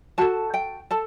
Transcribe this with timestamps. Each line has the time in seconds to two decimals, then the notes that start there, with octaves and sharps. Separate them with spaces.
0.18 F#4 A4 A5
0.54 G5
0.91 A4 A5